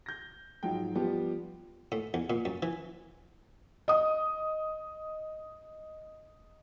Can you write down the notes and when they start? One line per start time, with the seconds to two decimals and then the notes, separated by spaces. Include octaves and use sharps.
0.06 G6 A#6
0.63 G#2 F3 F#3 G5
0.95 F3 G3 B3 F4 G4
1.92 A2
2.14 E2
2.30 A#2
2.45 F#2
2.63 E3
3.88 D#5 D#6